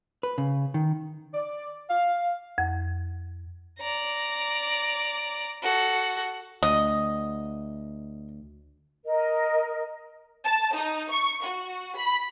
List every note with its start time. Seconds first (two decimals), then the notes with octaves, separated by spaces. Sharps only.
0.23 B4
0.38 C#3
0.74 D#3
1.34 D5
1.90 F5
2.58 F2
3.79 D5 A#5
5.62 F#4 A4
6.63 D2 D#5
9.05 A#4 D#5
10.44 A5
10.75 D#4
11.10 C#6
11.42 F#4
11.96 B5